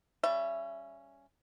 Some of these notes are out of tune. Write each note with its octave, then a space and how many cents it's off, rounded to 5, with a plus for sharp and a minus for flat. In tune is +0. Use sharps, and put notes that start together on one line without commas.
G3 +0 C#4 +0 E5 +30